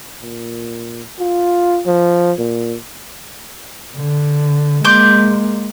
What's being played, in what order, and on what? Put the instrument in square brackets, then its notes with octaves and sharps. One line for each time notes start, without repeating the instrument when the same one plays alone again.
[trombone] A#2
F4
F3
A#2
[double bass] D3
[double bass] G#3 A#3 [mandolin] C6 D6 G6